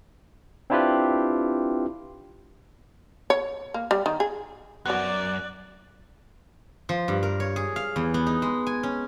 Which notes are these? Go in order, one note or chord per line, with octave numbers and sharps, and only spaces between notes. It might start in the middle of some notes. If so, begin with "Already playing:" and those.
C4 D4 E4 F4 G4 B4
C#5
A#3
G3
D#3
G#4
F#2 B3 F#4 D5 F#6
F3
G2
A#4
C#5
G#4
F5
E2
B3
D#4
G#3
G#5
C#4